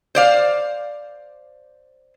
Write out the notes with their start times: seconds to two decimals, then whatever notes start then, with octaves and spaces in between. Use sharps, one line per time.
0.15 C5 D5 F5